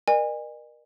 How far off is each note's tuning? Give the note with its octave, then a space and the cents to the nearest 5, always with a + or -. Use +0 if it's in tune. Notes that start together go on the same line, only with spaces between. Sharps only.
A#4 +25 D#5 -45 G#5 -30